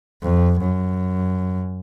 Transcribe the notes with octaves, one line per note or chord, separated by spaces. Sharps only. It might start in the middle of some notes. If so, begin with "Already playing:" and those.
F2
F#2